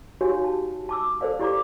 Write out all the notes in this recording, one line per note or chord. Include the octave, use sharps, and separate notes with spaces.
D#4 F#4 G4 C#5 F5 G#5
A5
A5 D6 E6
A4 A#4 C5 D5 F5
E4 G4 D5 A#5 D6